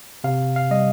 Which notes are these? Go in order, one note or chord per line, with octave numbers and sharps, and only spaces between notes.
C3 F5
F5
G3 D#5